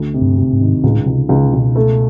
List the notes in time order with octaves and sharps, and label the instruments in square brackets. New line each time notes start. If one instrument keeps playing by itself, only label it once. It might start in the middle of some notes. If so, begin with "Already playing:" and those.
Already playing: [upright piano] D2
C3
[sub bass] G2
[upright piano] C3
[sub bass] G#2
[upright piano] D#3
[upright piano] C#2 [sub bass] A2
[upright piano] C#2 [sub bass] C3
[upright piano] C#2 [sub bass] C#3
[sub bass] C3
[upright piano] C#2 [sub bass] B2
[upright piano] A3